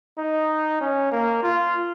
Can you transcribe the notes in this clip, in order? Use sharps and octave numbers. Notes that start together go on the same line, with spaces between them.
D#4
C#4
A#3
F4